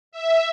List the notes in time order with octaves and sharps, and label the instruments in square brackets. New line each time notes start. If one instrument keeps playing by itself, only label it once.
[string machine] E5